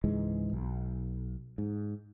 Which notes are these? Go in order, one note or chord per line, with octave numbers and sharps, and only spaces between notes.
C#2 G#2 E3 G#3
B1
G#2